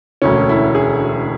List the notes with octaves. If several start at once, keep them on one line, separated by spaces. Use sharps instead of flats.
E1 D2 D3 C#4
E4
G#4